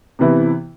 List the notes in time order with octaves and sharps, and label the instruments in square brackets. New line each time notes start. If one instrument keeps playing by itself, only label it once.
[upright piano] C3 E3 B3 E4